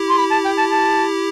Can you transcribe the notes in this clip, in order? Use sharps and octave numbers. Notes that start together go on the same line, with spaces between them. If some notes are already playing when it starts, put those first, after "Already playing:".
Already playing: E4 G4
C6
B5
A5
G5
A5
A5